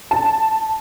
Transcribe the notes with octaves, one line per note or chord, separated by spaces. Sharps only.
A5